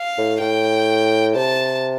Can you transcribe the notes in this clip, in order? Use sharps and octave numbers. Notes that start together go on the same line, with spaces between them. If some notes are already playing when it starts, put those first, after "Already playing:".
Already playing: F5
A2
A2 G5
C3 A5